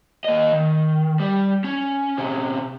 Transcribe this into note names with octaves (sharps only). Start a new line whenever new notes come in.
A#3 D#5
D#3
G3
C#4
C3 C#4